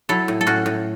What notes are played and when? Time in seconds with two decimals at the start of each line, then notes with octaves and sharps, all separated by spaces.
0.09 F#3 E4 A4
0.28 A2
0.41 A4
0.47 A2 C#4 F#4
0.66 A2